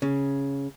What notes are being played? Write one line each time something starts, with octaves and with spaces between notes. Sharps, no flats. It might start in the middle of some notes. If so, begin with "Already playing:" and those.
C#3